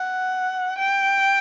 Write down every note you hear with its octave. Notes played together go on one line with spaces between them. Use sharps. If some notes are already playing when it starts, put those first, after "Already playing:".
Already playing: F#5
G5